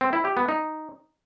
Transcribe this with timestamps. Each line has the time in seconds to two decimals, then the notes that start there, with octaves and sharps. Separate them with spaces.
0.01 C4
0.13 E4
0.25 G4
0.37 B3
0.49 D#4